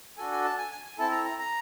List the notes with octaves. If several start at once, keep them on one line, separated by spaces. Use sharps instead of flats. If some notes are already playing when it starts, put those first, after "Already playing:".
D4 F#4 A4 G#5
G#5
A5
G#5
G#5
G#5
C4 E4 A4 A5
A#5
A#5
A#5